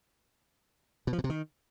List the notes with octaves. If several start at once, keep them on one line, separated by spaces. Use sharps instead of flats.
B2
F3
B2
C3
D#3